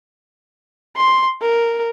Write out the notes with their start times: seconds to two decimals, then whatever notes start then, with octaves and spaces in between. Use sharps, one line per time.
0.97 C6
1.42 A#4